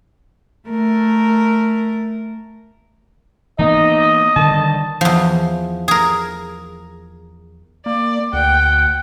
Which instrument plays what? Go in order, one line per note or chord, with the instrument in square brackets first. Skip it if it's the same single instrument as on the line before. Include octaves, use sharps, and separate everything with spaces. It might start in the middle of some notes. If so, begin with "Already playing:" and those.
[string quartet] A3 A#4
[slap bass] E3 A#3 B3 [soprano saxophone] D#4 [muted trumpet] D#5
[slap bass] D3 D#3 G3 [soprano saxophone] A5
[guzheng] E2 F3
G#4 A#4
[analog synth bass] A#3 [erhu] D5
[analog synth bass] D2 [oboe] F#5 [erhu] G5